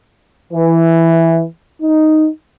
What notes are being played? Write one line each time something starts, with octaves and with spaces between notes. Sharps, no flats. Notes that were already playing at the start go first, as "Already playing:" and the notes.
E3
D#4